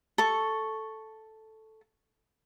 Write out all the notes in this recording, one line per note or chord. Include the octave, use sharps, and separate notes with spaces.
A4 C#6